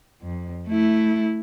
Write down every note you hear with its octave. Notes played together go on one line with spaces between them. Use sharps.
F2
A3 E4